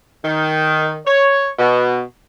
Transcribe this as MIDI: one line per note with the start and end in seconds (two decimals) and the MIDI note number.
0.24 0.97 51
1.06 1.48 73
1.59 2.01 47